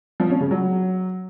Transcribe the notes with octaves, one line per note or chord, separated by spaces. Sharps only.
F3
C#4
C#3
F#3